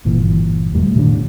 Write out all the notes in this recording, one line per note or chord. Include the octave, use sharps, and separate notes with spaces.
G1 A#2 E3
E1 D#2 G3 A3
A#2 D#3 D4